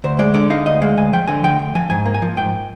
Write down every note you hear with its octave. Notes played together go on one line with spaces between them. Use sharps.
D2 C5
G#3 D5
D3 D5
D#4 F5
D2 D#5
G#3 F5
D2 G#5
F3 G5
D3 G#5
D2 G5
D2
F3 G#5
G#2 G#5
A#3
G#5
F3
G#2 G5